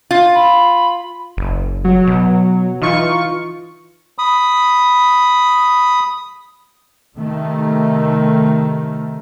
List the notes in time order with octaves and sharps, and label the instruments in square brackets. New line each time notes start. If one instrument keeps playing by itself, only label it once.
[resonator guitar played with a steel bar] F4
[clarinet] B5
[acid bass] F#1
[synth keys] F#3
[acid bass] B2
[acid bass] E3 [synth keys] D#4 F4 C#6
[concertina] B5 D#6
[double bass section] C3 D#3 A3